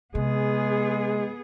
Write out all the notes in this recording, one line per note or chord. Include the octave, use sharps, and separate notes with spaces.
C3 G#3 B3 G#4